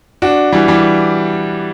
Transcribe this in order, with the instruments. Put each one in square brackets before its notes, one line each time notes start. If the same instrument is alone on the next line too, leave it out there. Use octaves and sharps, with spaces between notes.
[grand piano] D4 F#4
E3 G3
E3 G3